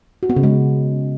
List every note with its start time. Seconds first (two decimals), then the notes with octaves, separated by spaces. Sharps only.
0.23 F#4
0.30 B3
0.36 C#3
0.43 G#3